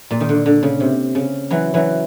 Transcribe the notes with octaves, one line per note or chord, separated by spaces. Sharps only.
A#2
D#3
D3
D3
C#3
C3
C#3
E3 F#3
E3 F#3